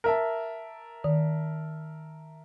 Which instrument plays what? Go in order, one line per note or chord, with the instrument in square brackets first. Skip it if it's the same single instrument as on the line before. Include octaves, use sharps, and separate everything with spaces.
[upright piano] A#4 E5 A5
[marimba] D#3